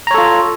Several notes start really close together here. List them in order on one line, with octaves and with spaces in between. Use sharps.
A#5 C#5 A4 F4